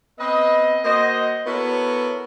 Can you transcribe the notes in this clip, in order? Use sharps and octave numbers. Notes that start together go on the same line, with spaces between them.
B3 C4 B4 D#5
A#3 F#4 C5 D#5
B3 E4 F#4 A4 A#4 C#5